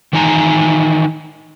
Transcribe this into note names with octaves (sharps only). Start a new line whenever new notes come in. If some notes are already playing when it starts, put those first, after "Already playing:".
D#3 E3 D#4 G#5 A#5